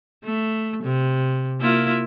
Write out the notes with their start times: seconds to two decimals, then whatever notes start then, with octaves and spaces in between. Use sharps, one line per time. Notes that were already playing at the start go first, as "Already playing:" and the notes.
0.24 A3
0.83 C3
1.60 A#3 E4 F4